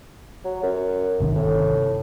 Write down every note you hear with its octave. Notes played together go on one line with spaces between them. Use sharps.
F#3
F#2
G1 C3 D#3
A2